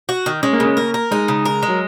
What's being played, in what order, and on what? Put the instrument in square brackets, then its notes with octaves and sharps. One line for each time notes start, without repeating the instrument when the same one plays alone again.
[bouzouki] F#4
D#3
[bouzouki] G#3 [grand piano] C#4
[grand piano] A#3
[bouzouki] C#3 [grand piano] C#4
[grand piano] A#3 [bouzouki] A#4
[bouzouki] A#4
[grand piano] G#3 [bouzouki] D#4
[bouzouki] C#3
A#4
G#3
[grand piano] F#3